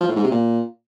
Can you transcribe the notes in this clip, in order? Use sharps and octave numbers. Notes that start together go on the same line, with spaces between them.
F3
A2
G#2
C3
A#2